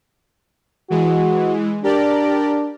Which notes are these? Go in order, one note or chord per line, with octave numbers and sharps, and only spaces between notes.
E3 G#3 F#4
D4 G4 A#4 D5